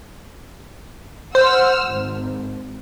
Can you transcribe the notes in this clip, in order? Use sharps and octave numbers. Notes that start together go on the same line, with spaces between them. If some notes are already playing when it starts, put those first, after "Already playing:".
C5 F#5 E6 F6
G#1